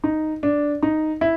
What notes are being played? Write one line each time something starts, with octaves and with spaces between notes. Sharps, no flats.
D#4
D4
D#4
E4